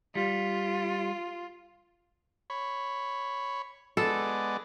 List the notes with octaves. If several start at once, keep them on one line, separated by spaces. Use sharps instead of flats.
G3 F4
C#5 B5
G#3 B3 A4 D5